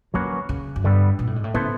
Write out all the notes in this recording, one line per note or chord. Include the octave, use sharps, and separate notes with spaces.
D3 F#3 A#3 C#4 F#4 B4
C#3
F#2
G2 D3 G3 B3
A#2
A2
G#2
A2
C#3 B3 E4 A4 C5